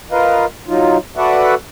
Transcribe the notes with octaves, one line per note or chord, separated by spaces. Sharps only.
F4 A#4 B4 D#5 F5
F#3 D#4 F4
F#4 A4 B4 D5 E5 F#5